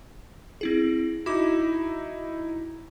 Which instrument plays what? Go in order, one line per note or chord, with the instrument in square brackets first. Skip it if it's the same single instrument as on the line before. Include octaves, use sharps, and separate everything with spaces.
[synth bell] C4 E4 G#4
[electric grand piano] D#4 E4 [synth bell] F#4 D6